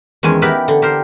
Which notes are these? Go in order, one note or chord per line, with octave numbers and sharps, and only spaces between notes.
E2 D#3 G#3 C#4 G#5
B3 D#4 E4 G4 A#4 B4
D3
G4 A#4 C5